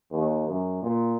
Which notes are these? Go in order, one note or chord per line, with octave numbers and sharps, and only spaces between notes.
D#2
F#2
A#2